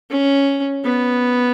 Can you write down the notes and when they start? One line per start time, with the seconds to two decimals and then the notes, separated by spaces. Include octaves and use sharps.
0.11 C#4
0.85 B3